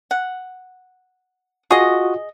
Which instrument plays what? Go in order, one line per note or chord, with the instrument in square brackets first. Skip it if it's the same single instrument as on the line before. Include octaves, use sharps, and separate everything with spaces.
[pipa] F#5
[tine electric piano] F4 F#4 D#6 [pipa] G#4 D#5